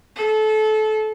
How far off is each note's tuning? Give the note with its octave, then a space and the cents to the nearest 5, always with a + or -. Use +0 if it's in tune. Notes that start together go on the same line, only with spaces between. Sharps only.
A4 -25